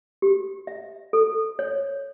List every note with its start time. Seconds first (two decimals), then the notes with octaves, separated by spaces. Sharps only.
0.22 G4
0.67 E5
1.13 A4
1.59 C#5